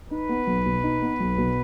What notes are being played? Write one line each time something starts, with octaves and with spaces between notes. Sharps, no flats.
D#4 B4
B3
B1
B2
D#4
B3
B1
B2